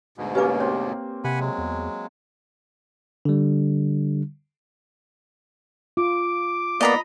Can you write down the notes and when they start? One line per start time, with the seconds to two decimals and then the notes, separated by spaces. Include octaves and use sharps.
0.18 D2 G#2 B2
0.35 A#3 C#4 G4 B4 D6
0.60 C4 C#5
1.24 C3 F#5 G#5 B5
1.40 F#3 G#3
1.58 E2
3.25 D3 G3
5.97 F4 D6
6.81 A#3 B3 D5 D#5 A#5 B5